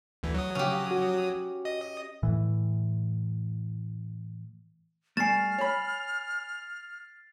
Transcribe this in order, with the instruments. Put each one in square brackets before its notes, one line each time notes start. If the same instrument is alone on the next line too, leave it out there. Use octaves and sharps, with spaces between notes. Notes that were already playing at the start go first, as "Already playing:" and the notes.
[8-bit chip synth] D2 E3
F#3 D#6
[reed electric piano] C#3 [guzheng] C#4 G4
[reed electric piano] F#4
[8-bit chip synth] D#5
[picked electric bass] A2 E3
[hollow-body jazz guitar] G3 A3 [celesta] G#5 E7 [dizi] F6 [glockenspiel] A6 C7
[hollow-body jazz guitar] C#5 B5